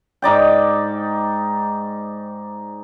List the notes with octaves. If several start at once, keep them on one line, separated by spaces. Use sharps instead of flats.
G#2 D#4 D5 G5